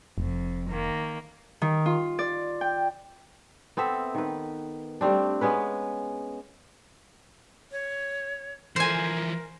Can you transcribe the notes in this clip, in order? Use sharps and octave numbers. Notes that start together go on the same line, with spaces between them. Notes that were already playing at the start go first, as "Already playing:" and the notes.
F1 F2
D#3 A#3
D#3
F4
D5
G5
B3 C4 A4 E5
D#3 B4
G3 A3 C4 D4
G#3 B3 C#4 B4
C#5
E3 F3 A#4 C5 G#5